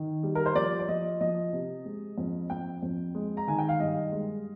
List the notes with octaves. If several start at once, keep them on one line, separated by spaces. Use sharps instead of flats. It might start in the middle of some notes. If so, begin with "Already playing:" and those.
Already playing: D#3
G3
A#4
C5
F3 D5
D5
F3 D#5
F3 D#5
C3
G#3
F2
F2 G5
F2
G#3
A#5
D#3 G#5
G5
F5
G2 D#5
G#3